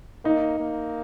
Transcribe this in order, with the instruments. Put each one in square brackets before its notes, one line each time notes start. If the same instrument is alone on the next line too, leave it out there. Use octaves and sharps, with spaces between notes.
[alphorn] A#3 [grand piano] D#4
[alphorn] A#3